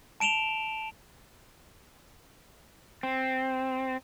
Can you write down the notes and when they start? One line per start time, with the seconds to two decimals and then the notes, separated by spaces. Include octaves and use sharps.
0.20 A5 D7 E7 F7 G7
3.03 C4